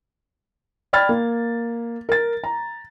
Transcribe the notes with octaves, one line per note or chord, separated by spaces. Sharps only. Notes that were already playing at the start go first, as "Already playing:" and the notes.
D5 G5 B5 F6 G#6 A6
A#3
A#4 A6
A#5